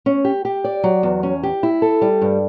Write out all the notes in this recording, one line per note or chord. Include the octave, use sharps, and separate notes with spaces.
C#4
G4
G4
D5
F#3
E2
C#4
G4
E4
A4
G3
G2